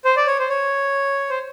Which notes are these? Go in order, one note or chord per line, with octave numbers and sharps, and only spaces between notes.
C5
D5
C#5
C5
C#5
C5